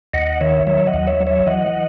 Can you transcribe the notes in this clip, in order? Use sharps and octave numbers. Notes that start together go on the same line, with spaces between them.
D#2 D#5 F#5
D#3 C#5 E5
F#3 C#5 E5
D#5 F#5
D#2
C#5 E5
F#3
C#5 E5
E3 D#5 F#5